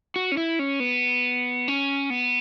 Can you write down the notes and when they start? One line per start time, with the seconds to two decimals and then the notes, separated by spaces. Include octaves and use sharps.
0.16 F#4
0.32 C#4
0.37 E4
0.59 C#4
0.80 B3
1.68 C#4
2.10 B3